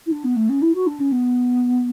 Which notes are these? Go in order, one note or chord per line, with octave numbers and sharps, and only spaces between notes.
E4
D4
B3
A3
C#4
E4
F#4
D4
C#4
B3